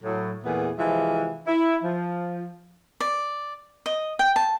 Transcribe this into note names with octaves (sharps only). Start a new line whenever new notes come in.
A2 F#3
E2 A#2 E3 A3 B3 G#4
C3 E3 F3 G#3 F4 E5
E4
F3
D5
D#5
G5
A5